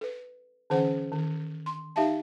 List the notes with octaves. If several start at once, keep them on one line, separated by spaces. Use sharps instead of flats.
A4 B4
D3 E3 C#4 C5 F#5
D#3
C6
D#4 G4 E5 F5 A5